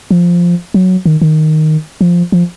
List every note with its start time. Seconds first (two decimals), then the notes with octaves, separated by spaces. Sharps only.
0.11 F3
0.74 F#3
1.06 D#3
1.22 D#3
2.01 F3
2.32 F3